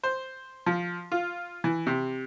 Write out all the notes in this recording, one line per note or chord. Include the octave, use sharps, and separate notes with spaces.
C5
F3
F4
E3
C3